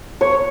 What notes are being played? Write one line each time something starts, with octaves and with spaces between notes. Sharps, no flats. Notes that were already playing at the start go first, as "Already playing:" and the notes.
C#5